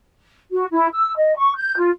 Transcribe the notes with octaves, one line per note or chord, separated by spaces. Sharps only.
F#4
E4
E6
D#5
C#6
G6
F4